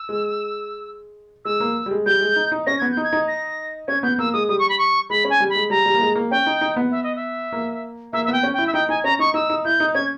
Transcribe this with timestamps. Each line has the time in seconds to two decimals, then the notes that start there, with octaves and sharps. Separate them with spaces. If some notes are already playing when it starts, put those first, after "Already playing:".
Already playing: E6
0.09 G#3
1.45 G#3 E6
1.60 A#3
1.86 G3
1.91 G#3
2.06 G3 G6
2.21 G#3
2.36 D#4
2.52 D#4
2.67 C#4 A#6
2.79 B3 G#6
2.92 G6
2.97 D#4
3.04 G#6
3.13 D#4
3.28 A#6
3.88 C#4 G#6
4.03 B3 G6
4.19 A#3 E6
4.33 G#3 D#6
4.49 G3 D#6
4.59 C#6
4.69 B5
4.78 C#6
5.10 G#3 B5
5.25 C#4
5.30 G#5
5.40 G3
5.50 B5
5.55 G#3
5.70 G3 A#5
5.86 G3
5.94 A#3
6.01 G#3
6.15 A#3
6.31 C#4 G5
6.46 D#4
6.61 D#4
6.76 B3
6.91 E5
7.03 D#5
7.16 E5
7.52 A#3
8.13 A#3 E5
8.25 E5
8.28 B3 G5
8.43 C#4
8.54 E4 G5
8.67 E5
8.74 D#4 G5
8.89 D#4 G#5
9.04 C#4 A#5
9.19 D#4 C#6
9.34 D#4 E6
9.50 D#4
9.65 E4 G6
9.80 D#4
9.95 C#4 G#6